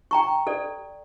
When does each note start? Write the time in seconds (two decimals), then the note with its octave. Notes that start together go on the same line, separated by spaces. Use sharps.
0.11 G5 A#5 C#6
0.47 A4 D5